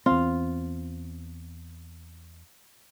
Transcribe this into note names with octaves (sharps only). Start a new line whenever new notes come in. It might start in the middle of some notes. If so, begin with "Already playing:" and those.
E2 C4 F4